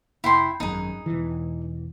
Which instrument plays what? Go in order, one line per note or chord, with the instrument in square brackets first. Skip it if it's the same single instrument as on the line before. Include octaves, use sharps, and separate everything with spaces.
[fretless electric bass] F1 [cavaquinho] E4 G5 C6
[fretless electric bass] G#1 F#2 [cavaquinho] D#4 G#4
[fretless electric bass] E1 E3